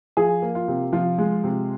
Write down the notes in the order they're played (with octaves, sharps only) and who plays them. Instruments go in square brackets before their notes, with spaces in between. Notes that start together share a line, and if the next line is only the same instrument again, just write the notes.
[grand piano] F3 G#4
A#3
F4
C3
F3 F4
G#3
C3